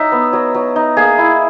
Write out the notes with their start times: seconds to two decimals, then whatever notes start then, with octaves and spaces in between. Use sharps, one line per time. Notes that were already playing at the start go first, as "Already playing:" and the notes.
Already playing: F#3 D#4 E5
0.12 B3
0.33 F#3
0.54 F#3
0.76 D#4
0.97 A#3 G#4
1.18 E4